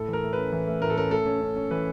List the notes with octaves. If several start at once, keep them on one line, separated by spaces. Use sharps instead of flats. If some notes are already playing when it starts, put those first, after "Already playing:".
Already playing: A2 A4
E3
A#4
A3
C#4 B4
E3
A3
A2 A#4
A4
C#4 A#4
A3 A4
C#4
C#4
C#4
E3 B4